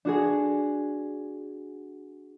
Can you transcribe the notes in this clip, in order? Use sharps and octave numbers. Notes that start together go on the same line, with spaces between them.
D4 F#4 G#4